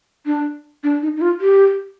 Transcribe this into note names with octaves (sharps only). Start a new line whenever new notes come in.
D4
D4
D#4
D#4
F4
G4